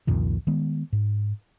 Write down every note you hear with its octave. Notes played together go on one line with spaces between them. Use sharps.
C2 F2 A#2 D#3
D#3 G#3 B3
G#2